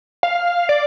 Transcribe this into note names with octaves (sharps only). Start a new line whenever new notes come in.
F5
D5